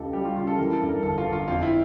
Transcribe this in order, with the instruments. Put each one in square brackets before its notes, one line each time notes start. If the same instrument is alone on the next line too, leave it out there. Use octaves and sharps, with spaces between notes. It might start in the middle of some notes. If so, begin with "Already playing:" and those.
Already playing: [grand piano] C#2 [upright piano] G4 A4
[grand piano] G3 [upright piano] G4
[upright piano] F4
[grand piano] C#3 [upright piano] F4
[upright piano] A4
[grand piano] E3 [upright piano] A#4
[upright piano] A4
[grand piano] G2
[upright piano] A#4
[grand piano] G1 [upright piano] A4
[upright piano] F4
[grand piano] G1
[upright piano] F4
[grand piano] F2 [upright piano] F4
[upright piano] E4